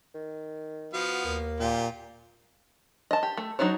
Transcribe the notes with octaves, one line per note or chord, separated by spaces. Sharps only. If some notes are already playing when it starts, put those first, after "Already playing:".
D#3
F3 B3 F#4 F5
D#2 A#3
A#2 F4 G4
D#5 A5
G4
A3
F#3 D4 D#4 C5 C#5